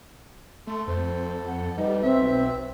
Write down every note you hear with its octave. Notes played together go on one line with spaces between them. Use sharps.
A3 A4 C6
F2 C5
F#5
G3 D#4 B4
B1 C4 E5